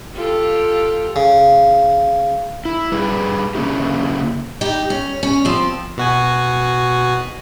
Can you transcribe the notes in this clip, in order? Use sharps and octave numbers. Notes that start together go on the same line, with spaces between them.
F4 G4 A4
C#3
E4
G3 G#4 B4
C#3 A#3 C#4 E4 G4
D#4 G4
C#4
C#4
F3 C4
B2 F#4 G#5